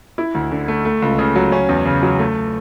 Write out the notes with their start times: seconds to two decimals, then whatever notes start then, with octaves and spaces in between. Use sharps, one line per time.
0.18 E4
0.35 D2
0.52 D3
0.68 A3
0.85 A3
1.02 C#2
1.19 C#3
1.36 F#3
1.52 C#4
1.69 E2
1.85 C#3
2.03 F#3
2.19 A3